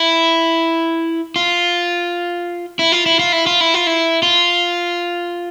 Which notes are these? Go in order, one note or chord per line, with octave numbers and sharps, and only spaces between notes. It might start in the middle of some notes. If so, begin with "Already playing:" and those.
Already playing: E4
F4
E4
F4
E4
F4
E4
F4
E4
F4
E4
F4